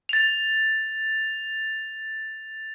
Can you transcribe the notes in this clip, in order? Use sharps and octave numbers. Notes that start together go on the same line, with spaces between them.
A6 F7